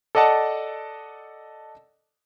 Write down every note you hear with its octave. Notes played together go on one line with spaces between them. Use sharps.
A4 D5 D#5 F#5 A5